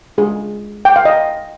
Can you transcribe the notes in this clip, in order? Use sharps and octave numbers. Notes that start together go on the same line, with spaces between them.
G#3 D4 F4 G#4
G5
F5
D#5